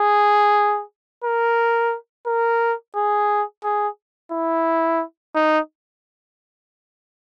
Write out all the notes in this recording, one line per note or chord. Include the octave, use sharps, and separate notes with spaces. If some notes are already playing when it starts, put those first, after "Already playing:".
Already playing: G#4
A#4
A#4
G#4
G#4
E4
D#4